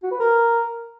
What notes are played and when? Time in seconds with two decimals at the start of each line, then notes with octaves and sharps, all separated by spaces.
0.03 F#4
0.11 B4
0.20 A#4